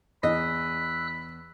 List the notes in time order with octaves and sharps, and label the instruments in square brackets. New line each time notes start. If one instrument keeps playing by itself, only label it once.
[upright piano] E2 [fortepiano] D#5 [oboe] B5 [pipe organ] E6 F#6